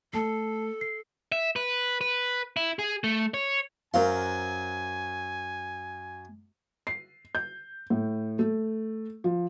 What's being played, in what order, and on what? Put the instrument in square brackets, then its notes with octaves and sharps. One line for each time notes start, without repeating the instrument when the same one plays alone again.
[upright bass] A3 [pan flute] A4 [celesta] A5 C7
[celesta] C7
[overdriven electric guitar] E5
B4
B4
E4
G#4
A3
C#5
[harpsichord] F#2 F#3 C6 [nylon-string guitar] A#4 C5 F5 [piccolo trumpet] G#5
[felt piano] C7
G6
A2
A3
F3